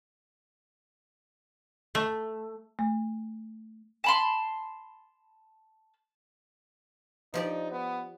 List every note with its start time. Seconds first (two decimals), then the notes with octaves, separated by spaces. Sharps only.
1.95 A3
2.79 A3
4.04 A5 B5 C6
7.34 F3 D#4 G4 D5
7.71 B3